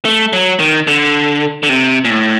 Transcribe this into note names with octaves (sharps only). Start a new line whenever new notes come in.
A3
F#3
D#3
D3
D3
C3
A#2
A2